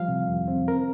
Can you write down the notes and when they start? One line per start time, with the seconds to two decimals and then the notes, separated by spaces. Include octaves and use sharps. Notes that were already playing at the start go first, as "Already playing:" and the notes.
Already playing: F3 G3 F5
0.08 C3
0.28 F2
0.48 C4
0.67 C4 A#4